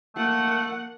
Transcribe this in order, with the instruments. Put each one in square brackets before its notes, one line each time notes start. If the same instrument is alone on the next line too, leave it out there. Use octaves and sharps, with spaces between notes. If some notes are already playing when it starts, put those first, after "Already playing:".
[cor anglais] A3 [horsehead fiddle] A#3 F#5